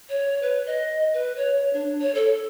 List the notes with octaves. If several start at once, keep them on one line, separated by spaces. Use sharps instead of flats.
C#5
B4
D#5
B4
C#5
D4
C#5
A4